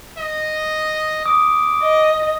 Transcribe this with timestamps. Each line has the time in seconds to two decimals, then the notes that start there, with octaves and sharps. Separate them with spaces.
0.17 D#5
1.26 D6 D#6
1.82 D#5